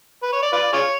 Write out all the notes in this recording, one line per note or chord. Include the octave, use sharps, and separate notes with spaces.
B4
C#5
D5
F4 B4 D5
F4 G#4 C#5